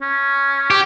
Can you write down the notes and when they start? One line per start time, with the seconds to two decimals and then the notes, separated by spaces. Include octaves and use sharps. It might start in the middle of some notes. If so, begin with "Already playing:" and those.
0.02 C#4
0.70 G4